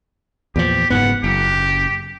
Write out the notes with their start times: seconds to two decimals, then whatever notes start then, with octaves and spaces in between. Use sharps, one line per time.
0.56 E2 A#2 F3 G4
0.90 F#1 G#2 B3 F#5
1.24 F#1 G4